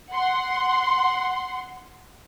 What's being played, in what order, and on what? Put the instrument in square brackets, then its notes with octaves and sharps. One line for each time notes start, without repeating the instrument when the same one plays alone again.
[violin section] F#5 C6